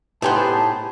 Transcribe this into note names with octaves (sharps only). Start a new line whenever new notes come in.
A2 B3 D#4 G4 G#4 C5 A5